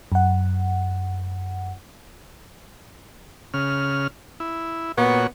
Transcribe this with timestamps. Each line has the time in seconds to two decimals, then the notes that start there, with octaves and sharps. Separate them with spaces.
0.12 F#2 F#5
3.54 C#3 F6
4.40 E4
4.98 A#2 B3 F#4 C#5